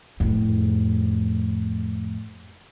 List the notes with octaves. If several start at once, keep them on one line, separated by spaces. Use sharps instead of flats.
F2 A2